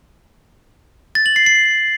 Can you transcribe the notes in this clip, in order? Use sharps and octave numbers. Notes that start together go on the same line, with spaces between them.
A6
F#7
C7
C7